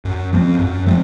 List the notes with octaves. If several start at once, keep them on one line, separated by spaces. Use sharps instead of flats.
F#2
F3 A3 C4
F#2
F3 A3 C4